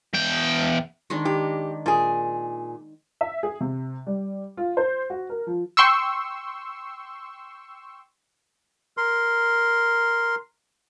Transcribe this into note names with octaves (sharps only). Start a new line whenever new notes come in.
E2 G5
D#3 G#3 D4
G4
A#2 G#4
E5
G#4
C3
G3
F4
C5
F#4
A#4
F3
G5 C6 C#6 E6
A#4 C6